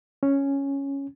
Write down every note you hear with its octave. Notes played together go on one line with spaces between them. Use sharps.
C#4